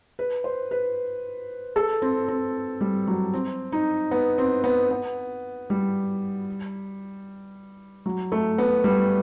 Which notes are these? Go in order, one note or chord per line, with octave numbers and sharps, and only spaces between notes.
B4
C5
B4
A4
C4
C4
G3
F#3
C4
D#4
B3
C4
B3
B3
G3
F#3
A3
B3
G3